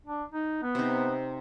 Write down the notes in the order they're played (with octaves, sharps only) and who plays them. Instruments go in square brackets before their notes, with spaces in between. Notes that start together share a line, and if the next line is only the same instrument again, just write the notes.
[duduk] D4
D#4
B3
[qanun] C3 D#4